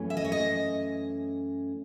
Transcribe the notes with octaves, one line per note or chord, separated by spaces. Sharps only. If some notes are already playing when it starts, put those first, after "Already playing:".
Already playing: F#2 E3 A3 C#4
E5
D#5
C#5
D#5